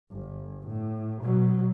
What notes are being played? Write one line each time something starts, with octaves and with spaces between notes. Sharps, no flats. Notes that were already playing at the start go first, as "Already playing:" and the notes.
G1
A2
B2 F#3